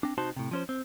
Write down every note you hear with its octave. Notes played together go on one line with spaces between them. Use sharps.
C4 D4
C3 D#4 F#4 C5 A5 C6
A2 C3
F3 C#4 C5
C4